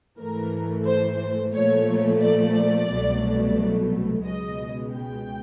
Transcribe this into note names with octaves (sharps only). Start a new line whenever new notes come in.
G#2 E3 A3 A#4
C5
A#2 F3 A3 C#5
D5
C2 B2 F#3 A3
C#2 B2 G#3 D#5
G5